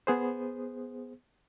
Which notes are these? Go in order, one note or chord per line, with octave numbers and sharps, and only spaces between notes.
B3 G#4 C5